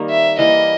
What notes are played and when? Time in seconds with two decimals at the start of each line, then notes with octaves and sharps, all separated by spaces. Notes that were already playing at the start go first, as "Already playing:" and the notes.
Already playing: D#3 G3 A#3
0.10 E5
0.39 E3 G3 A#3 D#5